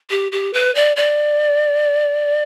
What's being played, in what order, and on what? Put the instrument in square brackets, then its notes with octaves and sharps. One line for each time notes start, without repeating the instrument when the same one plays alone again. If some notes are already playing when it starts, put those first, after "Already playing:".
[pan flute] G4
G4
B4
D5
D5